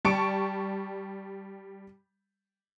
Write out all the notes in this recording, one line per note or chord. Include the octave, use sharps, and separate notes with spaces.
G3 A5 C#6 C#7 D7